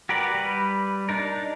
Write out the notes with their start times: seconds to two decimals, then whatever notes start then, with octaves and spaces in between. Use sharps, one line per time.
0.09 F#4 G4 A#4 B4 D5
0.35 G3 B4
1.09 D4 D#4 A#4